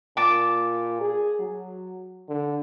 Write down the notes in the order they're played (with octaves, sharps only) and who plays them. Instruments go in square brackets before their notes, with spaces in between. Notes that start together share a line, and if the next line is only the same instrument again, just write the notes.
[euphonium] A#2 [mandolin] A5 D6
[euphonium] G#4
F#3
D3